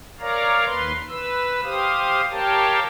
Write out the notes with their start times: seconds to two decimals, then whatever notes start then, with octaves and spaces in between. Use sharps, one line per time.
0.20 A#4 C#5 D5 F5 A#5
0.65 D#2 B4 C6
1.09 B4 E6
1.63 G4 C5 F5 D#6
2.31 G4 A#4 C#5 F5 G5 A5